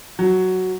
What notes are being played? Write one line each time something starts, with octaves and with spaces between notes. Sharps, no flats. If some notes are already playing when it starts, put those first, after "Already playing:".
F#3